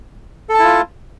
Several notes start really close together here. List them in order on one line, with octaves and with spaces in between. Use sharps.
A4 A5 E4 F4